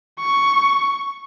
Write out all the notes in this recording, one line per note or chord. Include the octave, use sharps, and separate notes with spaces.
C#6